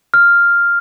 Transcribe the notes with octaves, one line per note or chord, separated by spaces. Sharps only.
F6